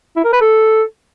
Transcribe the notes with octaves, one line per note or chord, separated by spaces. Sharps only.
E4
A#4
B4
A4